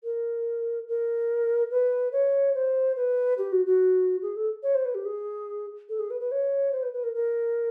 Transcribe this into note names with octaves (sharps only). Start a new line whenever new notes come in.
A#4
A#4
B4
C#5
C5
B4
G4
F#4
F#4
G#4
A4
C#5
C5
B4
G4
G#4
A4
G#4
B4
B4
C#5
C5
B4
B4
A#4
A#4